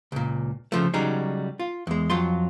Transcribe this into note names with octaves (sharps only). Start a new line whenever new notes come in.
C#2 A#2
C#3 F3 A3
C#3 F#3 G3 D#4 G#4
F4
E2 G#3
F2 F#3 F4 C6